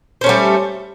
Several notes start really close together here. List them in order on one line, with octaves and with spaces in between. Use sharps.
C5 C#4 A3 G3